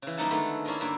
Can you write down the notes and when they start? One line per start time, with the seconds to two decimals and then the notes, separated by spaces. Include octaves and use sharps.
0.02 C#3 E3
0.17 F#2 G3 A#3 D#4 F#5 A5
0.31 D3 D#3 G#3 A3 B3 A4
0.65 A#3 C#4 E4 F4 A#4 D#5
0.80 G2 D3 A#3 E5